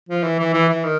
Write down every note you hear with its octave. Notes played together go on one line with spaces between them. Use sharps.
F3
E3
E3
E3
E3
D#3